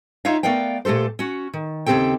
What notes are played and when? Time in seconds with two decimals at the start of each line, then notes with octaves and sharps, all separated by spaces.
0.25 D#4 F4 C#5 E5 F5
0.43 A3 B3 A#4 D5 F5 G5
0.85 A#2 A3 G4 A4 C5
1.19 C#4 F#4
1.53 D#3
1.86 D#2 C#3 C4 G4 A4 G5